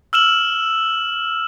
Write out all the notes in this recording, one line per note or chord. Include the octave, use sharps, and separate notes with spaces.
E6 F6 E7 F#7